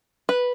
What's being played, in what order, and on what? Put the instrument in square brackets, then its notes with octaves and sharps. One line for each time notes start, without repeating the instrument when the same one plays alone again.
[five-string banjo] B4